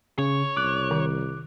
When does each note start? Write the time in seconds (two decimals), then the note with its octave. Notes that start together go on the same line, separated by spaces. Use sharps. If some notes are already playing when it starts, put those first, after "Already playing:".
0.18 C#3 C#5
0.57 C2 D6 F#6
0.91 D#3